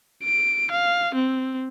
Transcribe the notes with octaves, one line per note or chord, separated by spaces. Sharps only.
D7
F5
C4